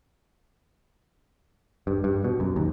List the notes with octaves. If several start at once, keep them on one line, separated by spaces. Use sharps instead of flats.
G2
G2
B2
F#2
D#2